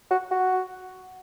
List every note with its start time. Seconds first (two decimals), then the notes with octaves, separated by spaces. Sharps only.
0.11 F#4
0.31 F#4